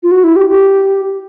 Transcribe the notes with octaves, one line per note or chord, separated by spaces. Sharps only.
F4
F#4
E4
G4
G4